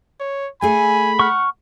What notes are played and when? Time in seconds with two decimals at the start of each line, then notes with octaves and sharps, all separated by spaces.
0.20 C#5
0.62 A3 G#4 G#5 B5
1.19 F#5 C#6 F6